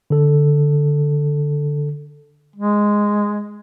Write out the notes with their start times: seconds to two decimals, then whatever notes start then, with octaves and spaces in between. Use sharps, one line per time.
0.10 D3 A4
2.56 G#3